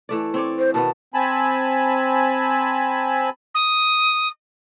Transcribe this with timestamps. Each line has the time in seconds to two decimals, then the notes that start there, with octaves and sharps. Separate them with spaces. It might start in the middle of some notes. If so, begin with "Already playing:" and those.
0.09 E3 A3 D5
0.34 C4 C#5 D5
0.59 C5
0.74 B2 D#3 B3 A5
1.14 C4 G#5 A5 B5
3.54 D#6